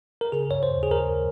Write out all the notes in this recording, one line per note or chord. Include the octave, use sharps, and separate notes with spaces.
A#4
C#3 G#4
C#5
C5
D#2
G#4
A#4